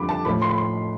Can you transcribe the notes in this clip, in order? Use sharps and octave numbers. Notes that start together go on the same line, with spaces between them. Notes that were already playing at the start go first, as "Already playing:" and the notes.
Already playing: F2 D3 G3 B5 D6
A5
A2 F3 B5
C6
B5
C6